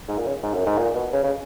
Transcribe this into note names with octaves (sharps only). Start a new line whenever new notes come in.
G#2
A#2
C#3
G#2
F#2
G#2
A#2
B2
C#3
C#3